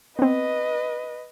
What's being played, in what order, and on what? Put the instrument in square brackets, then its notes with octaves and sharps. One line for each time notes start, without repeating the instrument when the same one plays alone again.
[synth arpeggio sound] B3 C4 [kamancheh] B4 D#5